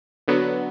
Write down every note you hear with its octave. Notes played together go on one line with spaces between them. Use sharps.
D3 F#3 B3